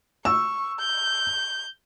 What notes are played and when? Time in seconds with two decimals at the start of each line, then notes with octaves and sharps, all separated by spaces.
0.25 C#6 E6
0.79 G6